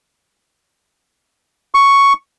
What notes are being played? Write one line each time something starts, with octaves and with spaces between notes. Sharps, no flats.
C#6